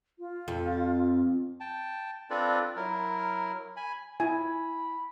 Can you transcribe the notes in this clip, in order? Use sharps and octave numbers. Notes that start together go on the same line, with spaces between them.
F4
F2
G5 A5
C4 D4 F4 A4 B4 D5
F#3 E4 A#4
G#5 B5
E4 G#5 B5